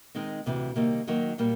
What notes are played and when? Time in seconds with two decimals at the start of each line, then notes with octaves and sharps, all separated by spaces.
0.15 D#3 G#3 C4 D#4
0.46 D2 C3 E3
0.76 C3 D#3 G3 A#3
1.08 D#3 F#3 A#3
1.38 A#2 G3 A#3